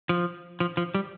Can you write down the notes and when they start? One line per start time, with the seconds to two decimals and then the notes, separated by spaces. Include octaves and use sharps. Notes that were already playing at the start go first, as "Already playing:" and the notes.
0.09 F3
0.60 F3
0.77 F3
0.95 G3